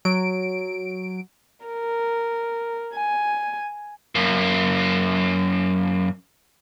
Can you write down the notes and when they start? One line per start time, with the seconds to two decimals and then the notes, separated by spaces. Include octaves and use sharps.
0.05 F#3 D7
1.65 A#4
2.94 G#5
4.15 F#2 A#3